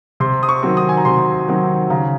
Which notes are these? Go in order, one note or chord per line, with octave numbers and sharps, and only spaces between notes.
C3 C6
D#6
C#6
D#3 F#3 C4
D#6
G#5
A#5
C3 C6
D#3 F#3 C4
C#3 A#5